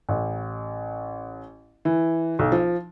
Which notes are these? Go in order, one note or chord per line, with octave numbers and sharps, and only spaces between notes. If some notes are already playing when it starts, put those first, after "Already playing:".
A1
E3
B1
F3